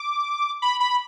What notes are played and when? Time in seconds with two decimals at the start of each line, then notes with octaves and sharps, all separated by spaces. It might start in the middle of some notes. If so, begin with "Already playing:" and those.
Already playing: D6
0.62 B5
0.80 B5